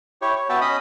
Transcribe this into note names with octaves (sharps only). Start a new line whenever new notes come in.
E4 G4 C#5
C#5
B3 F#4 E5 G5 A5
C#4 D#5 B5 D#6